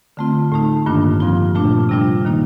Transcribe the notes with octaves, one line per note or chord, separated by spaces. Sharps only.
D3 A3 C4 F4
A2 A3 D#4
G2 D#3 A#3 D4 F4
G2 F3 C4 F4
A#2 A3 D4 F4
C3 G3 D4 F4
D#3 A#3 D#4